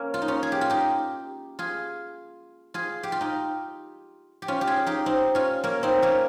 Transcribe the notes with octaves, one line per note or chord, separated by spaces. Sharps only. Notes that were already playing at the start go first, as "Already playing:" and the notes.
Already playing: A#3 C#4
F4
D#4
C#4 F4
G#4
G4
F4
D#4 G4
F4 G#4
F4 G#4
G4
F4
D#4 G4
G4
C#4 F4
G4
F4 G#4
D#4 G4
C4 D#4
C#4 F4
A#3 C#4
C4 D#4
A#3 C#4